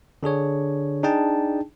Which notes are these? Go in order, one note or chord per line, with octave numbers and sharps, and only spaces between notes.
D3 D4 G#4 C#5
D4 D#4 G#4 G5 A5